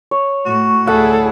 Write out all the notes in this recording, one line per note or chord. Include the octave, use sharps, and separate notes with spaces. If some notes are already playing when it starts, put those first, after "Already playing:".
C#5
A2 F#4
D2 E4 G#4 A4 F#5